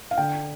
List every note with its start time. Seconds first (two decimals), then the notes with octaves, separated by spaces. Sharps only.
0.11 F5
0.17 D3 G5